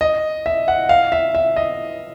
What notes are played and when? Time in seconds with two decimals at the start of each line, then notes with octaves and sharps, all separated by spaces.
0.01 D#5
0.46 E5
0.68 F#5
0.89 F5
1.12 E5
1.35 E5
1.56 D#5